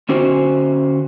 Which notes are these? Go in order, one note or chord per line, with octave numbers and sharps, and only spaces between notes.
D3 C#4 F#4 C5